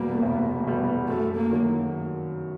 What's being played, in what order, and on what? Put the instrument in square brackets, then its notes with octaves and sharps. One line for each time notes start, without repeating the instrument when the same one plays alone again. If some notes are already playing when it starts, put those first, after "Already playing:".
Already playing: [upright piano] F1 E2 B2 G3 B3 [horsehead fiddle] A#3
[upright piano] F1
E2 B2 G3 B3
[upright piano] F#2 [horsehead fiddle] A3
[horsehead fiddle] A#3
[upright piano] D#3 F#3